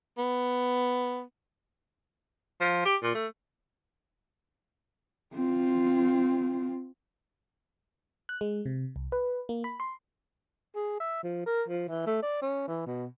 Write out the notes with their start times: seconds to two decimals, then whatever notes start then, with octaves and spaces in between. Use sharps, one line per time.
0.18 B3
2.61 F3
2.85 G4
3.03 A#2
3.15 A3
5.34 C4 F4
8.29 F#6
8.41 G#3
8.66 C3
8.96 C2
9.12 B4
9.49 A#3
9.64 B5
9.80 C6
10.75 G#4
11.00 E5
11.23 F3
11.46 A#4
11.68 F3
11.89 E3
12.06 A3
12.23 D5
12.42 C#4
12.68 E3
12.86 B2